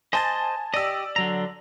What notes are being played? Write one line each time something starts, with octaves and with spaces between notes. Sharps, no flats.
C5 D#5 G#5 A5 A6
G4 D5 D#5 E6
D3 F#3 A#5